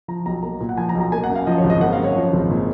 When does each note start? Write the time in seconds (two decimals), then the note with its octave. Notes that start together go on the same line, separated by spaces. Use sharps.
0.08 F3 A#5
0.26 B1 A#5
0.43 A#3 A#5
0.60 A#2
0.69 F#5
0.77 F3 G#5
0.89 A#5
0.95 B1
1.01 A#5
1.12 A#3 G#5
1.24 F#5
1.29 F#2
1.35 F5
1.47 F3 D#5
1.58 C#5
1.64 G#1
1.70 D#5
1.81 A#3 F#5
1.93 F5
1.98 F#2
2.04 C#5
2.16 F3
2.33 G#1
2.50 A#2